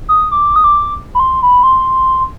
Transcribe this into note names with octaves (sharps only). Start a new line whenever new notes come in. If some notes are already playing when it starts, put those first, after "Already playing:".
D#6
D6
D#6
D6
B5
C6
B5
C6